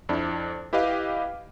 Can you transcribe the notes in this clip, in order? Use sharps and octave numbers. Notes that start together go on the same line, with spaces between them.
F2 D4 E4
E4 G4 B4 D#5 F5